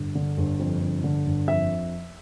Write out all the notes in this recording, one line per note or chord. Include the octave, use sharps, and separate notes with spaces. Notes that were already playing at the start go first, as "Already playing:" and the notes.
Already playing: G1
D3
G1
F2
G1
D3
G1
F2 E5